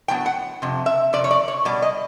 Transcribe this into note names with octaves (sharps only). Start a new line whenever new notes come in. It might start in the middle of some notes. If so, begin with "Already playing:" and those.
A2 F#3 B3 G5
F#5
F2 C3
E5
F2 C3 D5
C#5
D5
C#5
B2 G3 D5
D#5